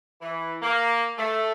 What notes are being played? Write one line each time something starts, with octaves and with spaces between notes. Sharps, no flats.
E3
A#3
A3